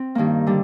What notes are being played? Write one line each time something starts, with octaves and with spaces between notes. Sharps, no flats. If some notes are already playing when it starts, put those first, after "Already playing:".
Already playing: C4
G2 D#3 A#3
D3 G3